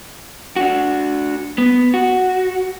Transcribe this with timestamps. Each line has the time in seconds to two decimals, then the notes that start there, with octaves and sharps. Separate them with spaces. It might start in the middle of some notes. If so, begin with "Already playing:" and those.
0.56 D4 F#4
1.58 B3
1.94 F#4